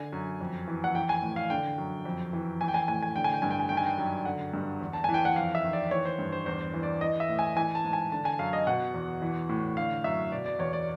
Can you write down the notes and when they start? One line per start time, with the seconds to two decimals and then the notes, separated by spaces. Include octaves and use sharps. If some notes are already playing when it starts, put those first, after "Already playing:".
Already playing: D3 G#5
0.13 F#2
0.41 F2
0.68 E3
0.84 F#5
0.95 E3 G5
1.09 G#5
1.22 A2
1.36 F5
1.50 D3 G5
1.78 F#2
2.05 F2
2.33 E3
2.61 E3 G#5
2.68 G5
2.74 G#5
2.88 A2 G#5
3.02 G#5
3.16 D3 G5
3.24 G#5
3.34 G5
3.42 G2 G#5
3.51 G5
3.60 G#5
3.69 D#3 G5
3.77 G#5
3.86 G5
3.98 F#2
4.25 D3 F#5
4.53 G2
4.81 E2
4.93 A5
5.04 E3 G#5
5.14 G5
5.25 F#5
5.36 F2 F5
5.55 E5
5.64 D#3
5.73 D5
5.91 E3 C#5
6.06 C5
6.19 G2
6.32 C5
6.46 E2 C5
6.74 E3
6.83 D5
7.01 E3 D#5
7.20 E5
7.29 A2
7.39 G#5
7.56 E3 G#5
7.75 A5
7.84 G#2
7.93 G#5
8.12 D3 A5
8.25 G#5
8.39 F#2 F5
8.53 D#5
8.67 B2 F#5
8.94 E2
9.22 E3
9.49 A2
9.77 D3 F5
10.04 F#2 E5
10.32 B2 D5
10.46 D5
10.59 E2 C#5
10.73 D5